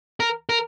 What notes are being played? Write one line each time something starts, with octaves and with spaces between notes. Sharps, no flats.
A#4
A#4